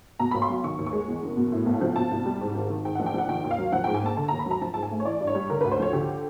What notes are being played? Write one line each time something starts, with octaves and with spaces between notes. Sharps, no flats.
B2 A#5
B1 B5
C6
F#3
D#3 C#6
D#2
C#6
G#3
E2
F#1
B2
A2
B1
F3
B2 A5
C2
G3
G#2
G#1
D#3
G#2 G5
A#1 F#5
G5
F3 F#5
D#3 G5
D#2
F5
F#3
F3 F#5
G#2 G5
G#5
A#3 A5
D3 A5
D#2 A#5
B5
F#3 A#5
F3 A5
G#2 A5
G#5
A3
C#5
E3 D5
G2
C#5
G3
D3 A#4
D2 B4
C5
F3 C#5
D3 G4